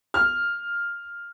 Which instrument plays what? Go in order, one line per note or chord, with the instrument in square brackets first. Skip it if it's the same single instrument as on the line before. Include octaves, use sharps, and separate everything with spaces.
[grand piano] F6